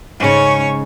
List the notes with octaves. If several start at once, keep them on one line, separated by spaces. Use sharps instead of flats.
G#2 C#3 C#4 C#5